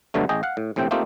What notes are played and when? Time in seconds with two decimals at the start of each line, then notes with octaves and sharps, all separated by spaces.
0.14 D2 G2 B2 D3 F#3 A3
0.29 A1 G#4 D#5 G5
0.43 F5 F#5
0.57 A2
0.76 A#1 A2 C3 C4 G5
0.91 A3 A#3 C4 D#4 F4 G4